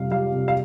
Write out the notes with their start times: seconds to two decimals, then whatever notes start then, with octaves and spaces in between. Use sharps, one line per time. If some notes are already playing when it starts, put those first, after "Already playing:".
Already playing: F2 C3 G3 F5
0.11 G3 F5
0.32 C3
0.48 F5